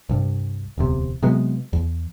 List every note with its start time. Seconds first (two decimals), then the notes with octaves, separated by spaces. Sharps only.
0.09 C2 G2
0.78 D1 E2 C3
1.23 C3 F#3 G#3 B3
1.73 E2